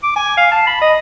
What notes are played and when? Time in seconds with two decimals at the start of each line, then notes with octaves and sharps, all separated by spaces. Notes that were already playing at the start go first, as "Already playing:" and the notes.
0.03 D6
0.16 G#5
0.37 F5
0.52 A5
0.67 B5
0.82 D#5